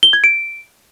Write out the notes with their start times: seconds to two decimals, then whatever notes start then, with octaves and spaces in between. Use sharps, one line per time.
0.03 G7
0.13 G#6
0.24 D7